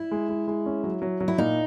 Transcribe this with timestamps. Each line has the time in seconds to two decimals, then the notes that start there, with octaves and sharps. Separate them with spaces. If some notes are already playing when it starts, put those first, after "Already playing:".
Already playing: E4
0.11 G#3
0.29 G#3
0.48 G#3
0.66 C#4
0.84 F#3
1.02 F#3
1.20 F#3
1.28 E4
1.38 A#2 D#4